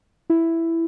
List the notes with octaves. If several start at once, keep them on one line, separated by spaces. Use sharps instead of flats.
E4